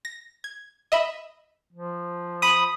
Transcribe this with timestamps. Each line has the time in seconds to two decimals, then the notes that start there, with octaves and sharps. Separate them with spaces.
0.05 A#6
0.44 G#6
0.92 D#5 E5 B5
1.73 F3
2.42 B5 D#6